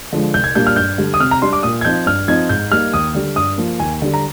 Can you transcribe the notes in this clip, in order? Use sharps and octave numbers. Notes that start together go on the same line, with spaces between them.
D3 F3 G#3
C2 G6
G#6
A#2 G3 A#3 D4 G6
F6
G2 G6
D3 G3
D#6
C3 F6
A#5
G3 D4 C6
D6
A#2 D#6
G#6
F3 C4 D#4 G6
G2 F6
F3 C4 D#4 G#6
G#2 G6
G3 A#3 D#4 F6
D#2 D#6
D3 G3
G2 D#6
F3 A#3
D#2 G#5
D3 G3
A#5